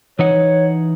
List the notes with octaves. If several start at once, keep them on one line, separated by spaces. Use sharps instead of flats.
E3 D#4 C#5 F#5